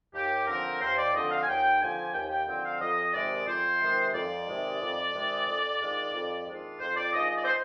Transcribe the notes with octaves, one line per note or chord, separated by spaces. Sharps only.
D#2 G4
D3 F3 C4 A#4
D#2 C5
D5
D3 F3 C4 D#5
F5
G#5
D#2 G5
D3 F3 C4 G#5
D#2 G5
G5
D3 F3 C4 G5
F5
F2 D#5
C3 D#3 G#3 D5
F2 C5
C3 D#3 G#3
F2 D5
C3 D#3 G#3
F2
C3 D#3 G#3
F2
D#3 G#3 D4 F4
F2
D#3 G#3 D4 F4
F2 C5
D5
D#3 G#3 D4 F4 D#5
D#5
D5
C5